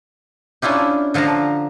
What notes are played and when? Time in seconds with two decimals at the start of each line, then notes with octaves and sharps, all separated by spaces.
0.62 C#4 D4 E4 F4 G4
1.14 D3 F3 F5 A5 A#5